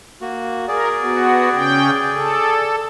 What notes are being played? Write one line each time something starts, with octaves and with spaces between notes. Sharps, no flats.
A#3 F#4
G#4 A#4 D5
B3 F#4
C#3 C#4 G5
A4